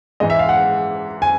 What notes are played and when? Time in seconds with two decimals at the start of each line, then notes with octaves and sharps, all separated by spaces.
0.20 G#2 E3 G#3 D#5
0.30 E5
0.39 F5
0.49 F#5
1.22 G#5